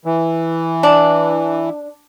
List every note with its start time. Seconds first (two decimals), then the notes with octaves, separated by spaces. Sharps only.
0.05 E3
0.83 D4